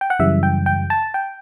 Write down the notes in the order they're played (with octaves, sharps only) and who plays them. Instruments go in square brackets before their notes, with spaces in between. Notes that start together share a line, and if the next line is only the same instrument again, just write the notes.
[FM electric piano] G5
F#5
F#2 C#3 E3 G3 E5
G5
G5
A5
G5